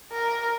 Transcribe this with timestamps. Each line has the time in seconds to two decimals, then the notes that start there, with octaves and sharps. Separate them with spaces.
0.12 A#4